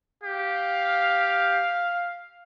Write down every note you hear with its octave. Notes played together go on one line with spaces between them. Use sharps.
G4 F5